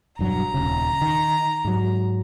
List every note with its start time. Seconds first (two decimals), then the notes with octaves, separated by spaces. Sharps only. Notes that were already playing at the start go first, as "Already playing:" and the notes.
0.19 E1 G2 F#3 A#5
0.54 D#1 A#1 C#3
1.01 D#3
1.65 G#2 F#3